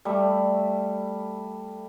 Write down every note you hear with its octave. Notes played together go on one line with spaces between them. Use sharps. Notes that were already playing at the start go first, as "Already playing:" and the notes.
G3 A3 E5